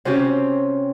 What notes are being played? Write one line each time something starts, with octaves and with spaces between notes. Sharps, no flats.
C3 C4 C#4 F4 G4